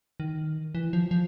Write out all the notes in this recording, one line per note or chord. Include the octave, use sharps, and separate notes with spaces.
D#3
E3
F3
F3